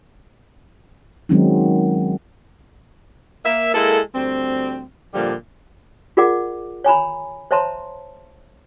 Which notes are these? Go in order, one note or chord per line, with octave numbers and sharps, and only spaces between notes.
D#3 F#3 G#3 C4 C#4 D#4
A#3 E5
G#3 A#3 E4 A4
D2 G3 C4
A#2 D3 F3 G3
F4 G#4 A#4 D5 F#5 D6
C#5 G#5 A#5 B5
C5 C#5 E5 A5 A#5 C6